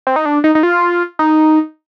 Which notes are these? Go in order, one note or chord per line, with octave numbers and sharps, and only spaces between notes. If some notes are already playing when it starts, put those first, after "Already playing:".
C4
D#4
D4
D#4
D#4
F4
D#4